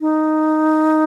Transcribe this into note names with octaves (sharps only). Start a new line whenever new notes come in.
D#4